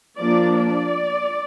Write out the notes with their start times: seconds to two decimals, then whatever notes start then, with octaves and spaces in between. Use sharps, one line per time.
0.19 F3 A#3 D4 D5
0.57 D5